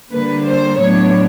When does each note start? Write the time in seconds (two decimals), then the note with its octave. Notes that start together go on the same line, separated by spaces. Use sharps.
0.11 D3 G3 A#3 B4
0.46 C5
0.80 A2 F#3 B3 D4 C#5